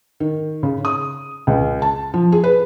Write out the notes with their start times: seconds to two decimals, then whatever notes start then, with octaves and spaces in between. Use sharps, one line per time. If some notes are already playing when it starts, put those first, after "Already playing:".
0.20 D#3
0.63 C#3
0.85 D#6
1.47 C#2
1.82 A5
2.14 F3
2.32 G#4
2.44 B4